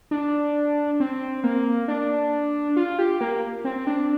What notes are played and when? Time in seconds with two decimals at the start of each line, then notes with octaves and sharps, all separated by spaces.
0.11 D4
1.00 C4
1.44 A#3
1.88 D4
2.76 F4
2.99 G4
3.21 A#3
3.65 C4
3.87 D4